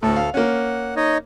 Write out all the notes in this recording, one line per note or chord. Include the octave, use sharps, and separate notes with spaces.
D2 A2 A4
F5
A#3 C#4 F#5
D#4 C#5 D#5